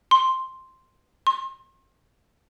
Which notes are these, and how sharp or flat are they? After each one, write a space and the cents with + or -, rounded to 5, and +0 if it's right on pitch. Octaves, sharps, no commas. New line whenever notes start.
C6 +0
C6 +40